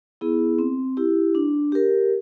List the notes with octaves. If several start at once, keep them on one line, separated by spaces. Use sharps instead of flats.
B3 E4 G#4
C4
E4 G4
D4
G4 A#4